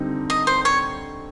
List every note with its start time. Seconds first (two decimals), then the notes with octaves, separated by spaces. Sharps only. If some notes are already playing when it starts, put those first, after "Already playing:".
Already playing: D3 G3 C4 D#4
0.30 D#5
0.47 C5
0.65 C#5